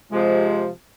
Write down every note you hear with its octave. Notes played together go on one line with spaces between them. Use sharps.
C3 F3 G#3